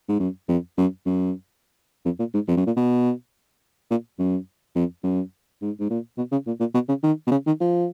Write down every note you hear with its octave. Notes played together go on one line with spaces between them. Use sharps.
G#2
F#2
F2
F#2
F#2
F2
A#2
G#2
F2
F#2
A#2
B2
A#2
F#2
F2
F#2
G#2
G#2
A#2
B2
C#3
A#2
A#2
B2
C#3
D#3
B2
C#3
D#3
F3